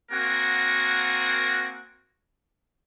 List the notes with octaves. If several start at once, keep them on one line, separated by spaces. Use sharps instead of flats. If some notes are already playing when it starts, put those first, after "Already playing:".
A#3 C4 F#4 A#4 F#5 G#5